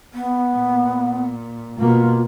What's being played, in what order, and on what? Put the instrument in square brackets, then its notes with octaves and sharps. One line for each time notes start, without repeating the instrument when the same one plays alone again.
[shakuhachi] B3
[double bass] A#2
[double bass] B2 A#3 [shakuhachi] F4